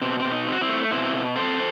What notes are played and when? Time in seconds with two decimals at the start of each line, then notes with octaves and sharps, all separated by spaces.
0.02 B2 C4
0.19 C4
0.25 B2
0.32 D#4
0.47 C4
0.52 F#4
0.61 C4 E4
0.69 A3
0.91 B2 C4 E4
1.14 B2
1.36 C4 A4 C5